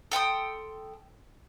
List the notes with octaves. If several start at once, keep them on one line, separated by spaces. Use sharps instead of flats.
A4 G5 C6 D#6